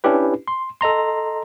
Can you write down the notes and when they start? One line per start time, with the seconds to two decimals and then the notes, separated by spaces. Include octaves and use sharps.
0.04 C#4 D4 E4 G4 B4
0.48 C6
0.81 A4 D#5 A#5 C6